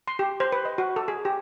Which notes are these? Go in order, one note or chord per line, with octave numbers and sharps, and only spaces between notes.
C6
G4
C5
B4
D#5
F#4
A4
G#4
G4